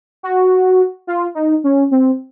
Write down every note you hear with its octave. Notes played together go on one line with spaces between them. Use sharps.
F#4
F4
D#4
C#4
C4